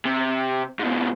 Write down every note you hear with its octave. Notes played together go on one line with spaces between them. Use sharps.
C3
G#2 B2